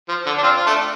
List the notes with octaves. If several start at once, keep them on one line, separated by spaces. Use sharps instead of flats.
F3
D3
D4
C4 F4
F4
A3 D4